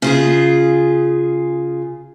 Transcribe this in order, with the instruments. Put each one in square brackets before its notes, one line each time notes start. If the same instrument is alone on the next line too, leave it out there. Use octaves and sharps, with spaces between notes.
[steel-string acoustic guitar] C#3 F4 G#4